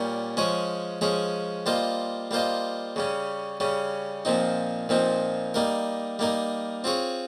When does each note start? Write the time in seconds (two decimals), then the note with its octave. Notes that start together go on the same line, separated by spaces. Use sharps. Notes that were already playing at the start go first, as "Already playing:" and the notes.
Already playing: A#2 G3 C#4 G4 A#4
0.37 F3 G#3 C#4 G#4 C#5
1.01 F3 G#3 C#4 G#4 C#5
1.66 G3 A#3 F4 C5 D#5
2.31 G3 A#3 F4 C5 D#5
2.96 C#3 G3 C#4
3.60 C#3 G3 C#4
4.25 A#2 F3 C4 D#4
4.89 A#2 F3 C4 D#4
5.54 G3 A#3 D#4 A#4
6.19 G3 A#3 D#4 A#4
6.84 C4 F4 G#4 C#5